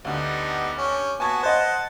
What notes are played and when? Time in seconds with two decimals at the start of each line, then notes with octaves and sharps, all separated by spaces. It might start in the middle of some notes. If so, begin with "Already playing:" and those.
0.05 D2 D3 G3 B3 D#4
0.77 C#4 G4
1.20 B3 F#4 G#5 A5 G#6
1.43 C5 D#5 F#5 A5